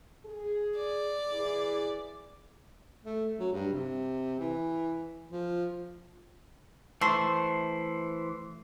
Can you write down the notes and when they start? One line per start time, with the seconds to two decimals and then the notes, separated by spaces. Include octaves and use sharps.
0.25 G#4
0.77 D5
1.32 E3 E4 G#4
3.05 A3
3.39 F#3
3.53 G2
3.73 C3
4.39 E3
5.31 F3
7.01 E3 A3 C5